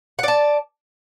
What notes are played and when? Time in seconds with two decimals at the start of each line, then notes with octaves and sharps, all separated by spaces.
0.19 F#5
0.23 D5
0.28 A5